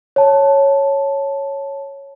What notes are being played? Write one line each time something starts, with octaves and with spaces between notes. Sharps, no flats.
C#5 A5